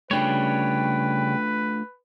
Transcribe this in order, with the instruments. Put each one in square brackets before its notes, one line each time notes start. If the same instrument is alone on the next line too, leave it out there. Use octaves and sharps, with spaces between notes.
[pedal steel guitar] C#3 G3 C#5 [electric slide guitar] A3 D4 F4 [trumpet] B4 [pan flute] G5